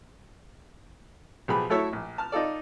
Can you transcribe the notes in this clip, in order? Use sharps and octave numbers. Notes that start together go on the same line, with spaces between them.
B1 F3 G4 G#4 B5
F#3 A3 E4 A4 C#5 E5
A#1
A5 F6
D#4 F4 A4 D5